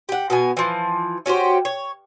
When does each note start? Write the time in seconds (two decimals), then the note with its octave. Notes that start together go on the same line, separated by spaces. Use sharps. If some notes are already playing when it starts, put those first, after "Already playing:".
0.09 G4 F#5
0.30 B2 B3 G#5
0.57 E3 F3
1.26 C#4 F#4 G4 C5
1.65 C#5